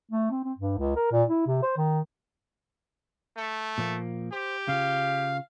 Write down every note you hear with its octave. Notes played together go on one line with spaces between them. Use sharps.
A3
C4
C4
G2
C#2
A#4
A#2
E4
C3
C5
D#3
A3
A#2 F3 A#3
G4 C5
C#3 F4 F5